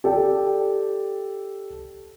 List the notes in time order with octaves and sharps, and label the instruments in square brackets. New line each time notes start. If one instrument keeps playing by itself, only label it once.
[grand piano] G4 A4 D5 G5